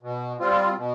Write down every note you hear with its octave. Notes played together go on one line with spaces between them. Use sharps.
B2
G3 C4 F4
B2